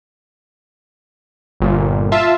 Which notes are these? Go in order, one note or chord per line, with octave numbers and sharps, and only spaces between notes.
G1 A#2
F4 E5 A5